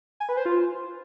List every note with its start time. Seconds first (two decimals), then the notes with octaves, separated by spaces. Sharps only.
0.20 G#5
0.29 B4
0.37 C5
0.45 F4